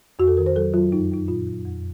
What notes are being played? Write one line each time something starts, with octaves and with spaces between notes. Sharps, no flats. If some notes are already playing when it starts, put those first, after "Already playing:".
F2 F#4
A4
D#3 A#4
C5
F#3 A4
F#3 F4
F#2 D#4
F#2 D#4
A#2 F4
F#3
F2